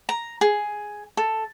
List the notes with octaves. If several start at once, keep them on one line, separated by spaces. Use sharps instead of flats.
A#5
G#4
A4